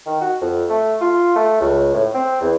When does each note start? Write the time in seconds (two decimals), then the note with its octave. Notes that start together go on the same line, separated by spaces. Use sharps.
0.06 D#3
0.21 F#4
0.41 F2
0.69 A3
1.01 F4
1.36 A3
1.60 C#2
1.94 A2
2.14 C4
2.41 E2